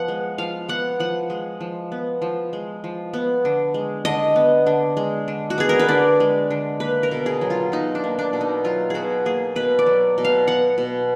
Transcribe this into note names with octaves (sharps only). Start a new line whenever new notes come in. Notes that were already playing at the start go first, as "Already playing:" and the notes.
Already playing: F3 B3 F#5
G#3
F3 F5
B3 F#5
F3 F#5
G#3
F3
B3
F3
G#3
F3
B3
D3
G#3
D3 D#5
B3
D3
G#3
D3
F#4
B3 G#4
A#4
B4
D3 D5
G#3
D3
A#3 B4
A#4
B2
G#4
F#3
F4
B2 D#4
D4
A#3
D4
B2
D#4
F#3 F4
B2 F#4 G#4
A#3 G#4
B2 B4
D5
F#3
B2
F5
B3 F#5
B2